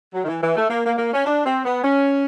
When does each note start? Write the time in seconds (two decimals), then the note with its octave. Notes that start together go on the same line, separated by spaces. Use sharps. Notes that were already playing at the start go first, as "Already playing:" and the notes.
0.14 F#3
0.24 D#3
0.28 E3
0.42 E3
0.56 A3
0.70 A#3
0.85 A#3
0.98 A#3
1.13 C#4
1.26 D4
1.45 C4
1.65 B3
1.83 C#4